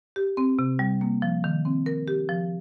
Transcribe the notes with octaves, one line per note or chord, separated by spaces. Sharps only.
G4
C4
C3
G3
A#3
F3
D#3
C4
A#4
G4
F3